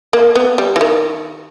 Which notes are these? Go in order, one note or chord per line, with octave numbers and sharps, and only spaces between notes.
A#3
B3
G3
E3
D#3